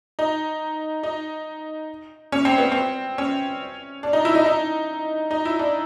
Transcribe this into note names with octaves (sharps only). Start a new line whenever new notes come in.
D#4
D#4
C#4
C4
B3
C4
C#4
D4
D#4
E4
D#4
D#4
D#4
E4
D4